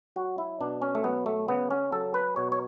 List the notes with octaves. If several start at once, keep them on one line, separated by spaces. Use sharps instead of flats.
F#3 F#4
E4
B2 D4
C#4
A3
F#3 B3
A3
C#3 B3
C#4
F#3 A4
B4
B2 C#5
C#5